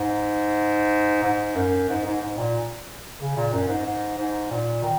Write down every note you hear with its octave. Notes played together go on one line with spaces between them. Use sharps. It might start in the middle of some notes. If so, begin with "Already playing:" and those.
Already playing: G#2
G#2
F#2
G#2
G#2
G#2
A#2
C#3
A#2
F#2
G#2
G#2
G#2
A#2
D#3